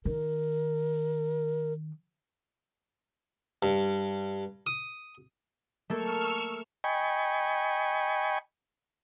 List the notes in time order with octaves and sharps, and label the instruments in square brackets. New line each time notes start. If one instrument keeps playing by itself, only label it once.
[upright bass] D#3 [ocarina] A#4
[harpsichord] G2
D#6
[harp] A3 A#3 A4 [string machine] C#6 E6 F6
[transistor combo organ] D#5 G5 G#5 B5 C#6